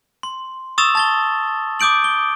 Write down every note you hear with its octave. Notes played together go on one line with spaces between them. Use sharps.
C6
C#6 D#6 E6 A6 E7 F7
A5 A6 G7
D6 D#6 G6 D7 F#7
G7